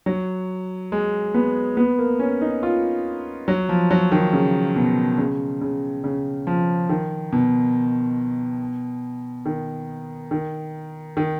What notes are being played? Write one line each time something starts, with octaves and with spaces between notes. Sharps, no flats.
F#3
G#3
B3
B3
A#3
C#4
D#4
F4
F#3
F3
F#3
D#3
C#3
B2
C#3
C#3
C#3
F3
D#3
B2
D#3
D#3
D#3